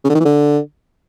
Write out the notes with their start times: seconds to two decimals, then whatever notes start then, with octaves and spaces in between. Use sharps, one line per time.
0.04 C#3
0.10 D3
0.15 D#3
0.20 E3
0.25 D3